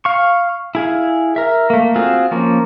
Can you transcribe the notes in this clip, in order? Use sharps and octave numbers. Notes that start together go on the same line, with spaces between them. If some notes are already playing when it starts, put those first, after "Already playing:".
F5 C#6
E4 G#4 F5
A#4 E5
A3 A#3
C4 F4 F#4 G#4
F3 A#3 C#4